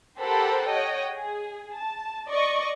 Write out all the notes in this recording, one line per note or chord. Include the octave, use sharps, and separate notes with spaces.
G4 A4 A#4 C5 F#5 B5
C#5 D#5 F#5 G5
G#4
A5
D5 D#5 C#6